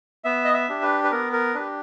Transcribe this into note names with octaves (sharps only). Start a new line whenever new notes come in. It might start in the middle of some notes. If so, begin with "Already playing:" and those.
B3 E5
D#5
E5
D4 G4
B4
B4
B3 A#4
A#4
D4 G4 B4